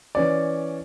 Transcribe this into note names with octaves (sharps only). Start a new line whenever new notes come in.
E3 C#4 D5